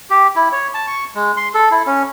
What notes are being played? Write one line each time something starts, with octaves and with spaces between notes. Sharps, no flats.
G4
E4
C#5
A5
C#6
G#3
C6
A4
E4
C#4